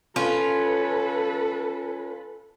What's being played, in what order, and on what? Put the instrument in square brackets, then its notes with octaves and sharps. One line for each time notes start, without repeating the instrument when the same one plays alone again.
[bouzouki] C#4 F4 [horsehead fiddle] A4 B4